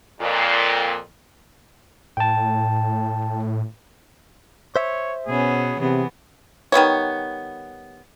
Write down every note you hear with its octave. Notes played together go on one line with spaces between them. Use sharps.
F2 A#2
A2 G5 A5
C5 C#5 E5
B2 B3 C#4 G#4
C3 E3 B3 G#4
D#3 G3 B3 C#5